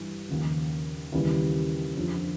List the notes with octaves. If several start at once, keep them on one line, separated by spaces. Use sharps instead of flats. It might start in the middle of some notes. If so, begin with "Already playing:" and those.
Already playing: G2 E3 G3
D#2 C#3 F3
D#2 C#3 E3 G3
F2 D3 F3